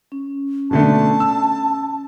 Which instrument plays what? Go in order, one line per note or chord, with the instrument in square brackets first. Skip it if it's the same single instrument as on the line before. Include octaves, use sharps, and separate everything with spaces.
[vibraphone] C#4
[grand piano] B2 D3 A3 [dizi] A5
[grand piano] E6